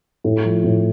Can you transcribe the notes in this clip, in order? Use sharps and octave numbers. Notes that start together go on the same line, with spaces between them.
A2
F3
A2